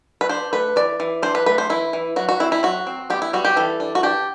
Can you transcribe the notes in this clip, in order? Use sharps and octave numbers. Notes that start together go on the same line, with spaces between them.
B4
D4 C5
A3 B4
E3 D5
E3
D4 C5
B4
A3 B4
C5
E3 E4
E3
F#3 F#4
F#4
C4 E4
E4
F#3 F#4
C4
B3 G4
E4
G3 F#4
G4
E3 A4
D4
F#4
D4 G4